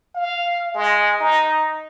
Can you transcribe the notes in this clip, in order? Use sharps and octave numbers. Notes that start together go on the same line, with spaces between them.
F5
G#3
D#4